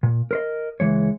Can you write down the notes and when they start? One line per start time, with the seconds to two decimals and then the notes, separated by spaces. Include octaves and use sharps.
0.03 A#2
0.31 A#4 C5 D#5
0.80 C#2 E3 G#3 C#5